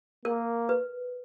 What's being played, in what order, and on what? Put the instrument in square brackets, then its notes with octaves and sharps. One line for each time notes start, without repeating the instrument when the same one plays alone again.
[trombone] A#3 [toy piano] A#4
[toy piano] B4